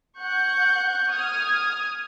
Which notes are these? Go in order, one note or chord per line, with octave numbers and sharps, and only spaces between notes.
F#5 C#6 F#6 G6
D#6 F6 G#6